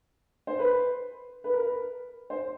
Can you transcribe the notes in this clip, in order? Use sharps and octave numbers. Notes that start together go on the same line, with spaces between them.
C5
B4
B4
A#4
B4
C5